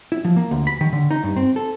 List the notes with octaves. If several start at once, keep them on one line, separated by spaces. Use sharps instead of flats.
E4
F3
A#3
D2
B5
D#3
D3
D#4
G2
C4
A4